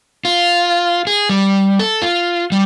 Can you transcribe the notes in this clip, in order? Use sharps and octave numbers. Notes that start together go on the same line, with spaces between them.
F4
G#4
G3
A4
F4
G3